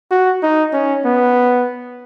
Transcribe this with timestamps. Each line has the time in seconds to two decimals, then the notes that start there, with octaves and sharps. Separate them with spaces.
0.11 F#4
0.43 D#4
0.73 C#4
1.05 B3